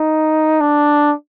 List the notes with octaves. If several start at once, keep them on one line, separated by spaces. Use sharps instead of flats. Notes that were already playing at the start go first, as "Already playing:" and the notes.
Already playing: D#4
D4